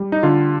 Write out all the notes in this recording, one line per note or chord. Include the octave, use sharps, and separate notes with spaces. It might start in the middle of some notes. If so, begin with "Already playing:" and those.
Already playing: G3
D#4
D3 F4